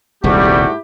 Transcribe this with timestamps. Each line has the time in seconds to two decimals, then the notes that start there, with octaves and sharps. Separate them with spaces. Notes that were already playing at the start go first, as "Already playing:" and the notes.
0.24 D#1 C2 G#2 G3 A3 E4 F#4 G4